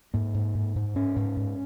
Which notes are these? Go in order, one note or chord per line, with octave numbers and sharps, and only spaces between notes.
G#2 A#3
G#2
G#2
G#2
G#2 C#4
G#2
G#2